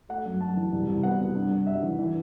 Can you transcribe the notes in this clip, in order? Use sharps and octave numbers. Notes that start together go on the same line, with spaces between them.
A3 F#5
F#2
F#2 A5
E3
C2
C2
B3 F#5
C3
G2
G2
G2 E5
E3
E3